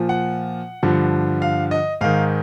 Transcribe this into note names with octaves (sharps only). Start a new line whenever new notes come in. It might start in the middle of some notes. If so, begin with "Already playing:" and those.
Already playing: A#2 F3
F#5
G2 D3 F3
F5
D#5
G#2 D#3 F5